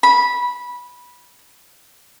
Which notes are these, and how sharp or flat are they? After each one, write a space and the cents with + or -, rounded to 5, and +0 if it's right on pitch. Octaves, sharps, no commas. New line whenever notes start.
B5 -15